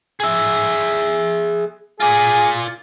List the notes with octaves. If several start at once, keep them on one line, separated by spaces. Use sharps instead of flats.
G#4 E5
F4 G#4 D5